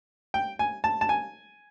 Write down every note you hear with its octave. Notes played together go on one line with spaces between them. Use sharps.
G5
G#5
A5
A5
G#5